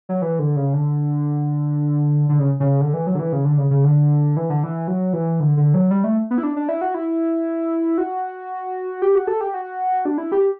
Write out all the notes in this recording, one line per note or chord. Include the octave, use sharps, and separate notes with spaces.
F#3
E3
D3
C#3
D3
D3
C#3
C#3
D3
E3
F#3
D3
E3
C#3
D3
C#3
C#3
D3
E3
D3
E3
F#3
E3
D3
D3
F#3
G3
A3
B3
E4
D4
D4
E4
F#4
E4
F#4
G4
F#4
A4
G4
F#4
D4
E4
G4